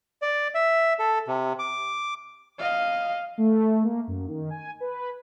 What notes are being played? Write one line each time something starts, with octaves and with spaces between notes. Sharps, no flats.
D5
E5
A4
C3
D6
D#5 F5
A3
A#3
F#2
D#3
G#5
B4